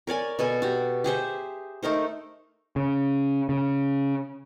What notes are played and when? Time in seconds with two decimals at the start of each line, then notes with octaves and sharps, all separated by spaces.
0.07 A#4 C#5 D5 G#5
0.39 B2 A4 G#5
0.62 F#4 G4
1.04 G4 G#4 C5 E5
1.83 A3 D#4 A#4 C5
2.76 C#3
3.49 C#3